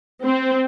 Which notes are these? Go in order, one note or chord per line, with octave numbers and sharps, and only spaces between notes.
C4